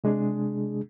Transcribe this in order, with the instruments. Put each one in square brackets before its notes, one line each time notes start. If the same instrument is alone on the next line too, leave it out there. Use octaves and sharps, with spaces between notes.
[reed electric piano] C3 G#3 D4 G#4